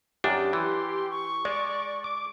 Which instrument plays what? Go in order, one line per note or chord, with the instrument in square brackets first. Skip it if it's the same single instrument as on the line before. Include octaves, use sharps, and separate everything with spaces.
[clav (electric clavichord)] F#2 D#3 D4 [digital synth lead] G4
[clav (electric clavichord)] E3 [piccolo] C6
[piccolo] C#6
[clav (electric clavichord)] G#3 [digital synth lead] D5
[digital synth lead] D6